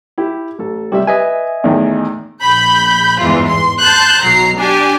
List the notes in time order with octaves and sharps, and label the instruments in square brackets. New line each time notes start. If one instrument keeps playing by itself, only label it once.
[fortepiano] E4 G4
A1 A4
[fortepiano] C2 G3 E5 [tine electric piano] G4
[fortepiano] B4 [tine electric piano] D#5 E5 G#5
[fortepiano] E2 A2 D#3
[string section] A#1 B5 G6
G1 E2 G#2 E3 F4
C6
A5 C6 F#6 G6
B1 F#3 A#5 C7
D4 G4 G#5